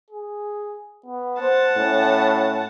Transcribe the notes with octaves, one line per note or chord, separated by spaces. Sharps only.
G#4
B3
C5 F#5 A5
A2 C#4